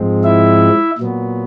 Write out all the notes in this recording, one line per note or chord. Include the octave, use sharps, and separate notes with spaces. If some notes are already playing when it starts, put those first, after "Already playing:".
Already playing: G#2 F3 G#3 C4
E4 E5
A#2 F#3 B3